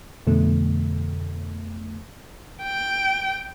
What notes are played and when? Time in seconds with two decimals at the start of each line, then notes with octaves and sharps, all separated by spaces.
0.27 F2 B2 D3 A3
2.62 G5